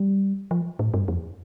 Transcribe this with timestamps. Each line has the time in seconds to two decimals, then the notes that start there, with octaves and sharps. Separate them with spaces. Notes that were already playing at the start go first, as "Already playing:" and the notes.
Already playing: G3
0.51 F3
0.79 A2
0.94 G2
1.08 F2